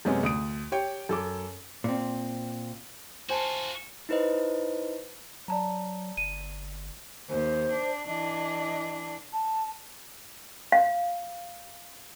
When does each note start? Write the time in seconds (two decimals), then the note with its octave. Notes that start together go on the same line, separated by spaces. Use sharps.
0.05 F#2 C3 G#3 B3 C#4
0.23 D2 D#6 D7
0.72 G4 C#5 G5
1.09 F#2 A4 D6
1.84 A#2 C4
3.29 F4 F#4 C5 G#5 A5
4.09 D#4 E4 B4 C5 D#5
5.48 F#3 D5 A5 A#5
6.17 G1 D#7
7.29 D#2 C5
7.73 D4
8.08 E3 D4 D#5
9.33 A5
10.72 F5